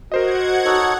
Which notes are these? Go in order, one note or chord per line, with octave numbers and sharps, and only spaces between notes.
F#4 A#4 C5 D#5 F#5 G#6
D#4 A4 C#5